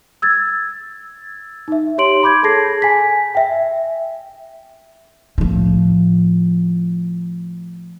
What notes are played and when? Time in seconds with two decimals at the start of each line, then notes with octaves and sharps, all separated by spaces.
0.22 E6 G#6 A6
1.68 D#4 E5
1.98 G4 C#5 C6 D7 F#7
2.23 B5 D6 G6 G#6
2.43 G#4 A4 A5 G#6 A#6 C7
2.82 G#5 B6
3.35 E5 G5
5.38 A2 F3